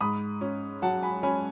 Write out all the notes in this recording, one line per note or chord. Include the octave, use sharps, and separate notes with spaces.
G#2 B5 D#6
C#4
F#3 F#5 A5
G#5 B5
C#4 G#5 B5